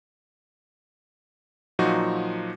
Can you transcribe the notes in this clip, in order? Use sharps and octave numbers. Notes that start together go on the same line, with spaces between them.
A#2 F3 F#3 D#4 F#4